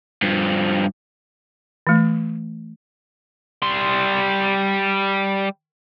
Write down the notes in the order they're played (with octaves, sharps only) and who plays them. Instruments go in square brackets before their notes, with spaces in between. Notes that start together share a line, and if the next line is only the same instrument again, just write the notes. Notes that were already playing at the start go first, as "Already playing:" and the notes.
[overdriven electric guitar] G2 F3
[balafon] E3 A3
[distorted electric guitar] G3 C6